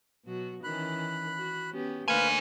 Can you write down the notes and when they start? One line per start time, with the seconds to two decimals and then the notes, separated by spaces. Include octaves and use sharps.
0.25 B2 F#3 F#4
0.64 D#3 E3 C#4 B5 F#6
1.38 F#4
1.72 B3 C#4 G4
2.08 D3 A3 A#3 B4 C5 F5 G#5